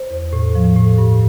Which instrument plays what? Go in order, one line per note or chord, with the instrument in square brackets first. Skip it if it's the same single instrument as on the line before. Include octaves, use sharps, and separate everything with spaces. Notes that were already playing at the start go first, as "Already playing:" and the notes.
Already playing: [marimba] C5
E2
A2
F3
A2
G2